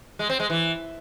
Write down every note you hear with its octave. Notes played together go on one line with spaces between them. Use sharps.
G#3
C4
G#3
E3